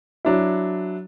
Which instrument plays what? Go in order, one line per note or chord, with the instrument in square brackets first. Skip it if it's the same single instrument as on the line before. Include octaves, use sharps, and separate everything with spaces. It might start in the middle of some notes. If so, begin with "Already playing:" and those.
[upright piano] F#3 D4 E4